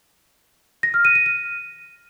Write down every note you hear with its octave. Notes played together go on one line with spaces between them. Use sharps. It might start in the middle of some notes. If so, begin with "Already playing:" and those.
A#6
F6
D#7
D#7
D#7